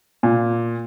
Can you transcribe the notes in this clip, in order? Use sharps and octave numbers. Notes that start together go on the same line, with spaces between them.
A#2